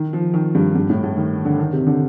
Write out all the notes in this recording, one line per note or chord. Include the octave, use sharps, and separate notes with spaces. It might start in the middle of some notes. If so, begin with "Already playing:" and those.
Already playing: D#3
F3
D#3
G2
G2
A2
A2
D#3
D3
D#3
C3
D3